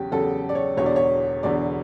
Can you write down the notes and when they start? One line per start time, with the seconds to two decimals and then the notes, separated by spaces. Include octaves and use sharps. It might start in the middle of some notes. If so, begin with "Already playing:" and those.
Already playing: E2 C#3 F#3 G4
0.11 E2 C#3 F#3 A4
0.49 D5
0.55 C#5
0.77 E1 E2 D3 C#5
0.86 D5
0.96 C#5
1.43 E1 E2 D3 D5